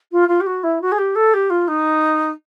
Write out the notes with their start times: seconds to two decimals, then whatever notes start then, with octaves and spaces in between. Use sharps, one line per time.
0.12 F4
0.28 F4
0.40 G4
0.46 F#4
0.63 E4
0.81 F#4
0.92 G#4
0.98 G4
1.15 A4
1.34 G4
1.50 F4
1.68 D#4